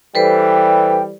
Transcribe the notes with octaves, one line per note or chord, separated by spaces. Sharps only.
E3 G3 A4 B4 C5 G5